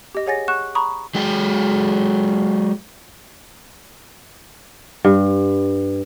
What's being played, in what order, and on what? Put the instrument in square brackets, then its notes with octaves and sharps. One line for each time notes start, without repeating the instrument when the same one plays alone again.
[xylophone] G4 D#5
G#4 C#5 F#5 G#5 A6 A#6
F#5 C#6 F#6 E7
A#5 B5 C#6 D#6
[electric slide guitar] F#3 G#3 G#4 G5
[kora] G2